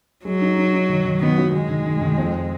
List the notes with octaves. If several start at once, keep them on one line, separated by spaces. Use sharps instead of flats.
F#3 G#3
D#4
D#4
D#4
D#3
D#3
D#3 B3
F#3
D#3 G#3
D#3
D#3
D#3
F2